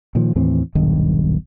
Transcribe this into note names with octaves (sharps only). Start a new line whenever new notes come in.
A#2 D#3 F3
D#2 A2 E3 C4
D#1 B1 G2 D#3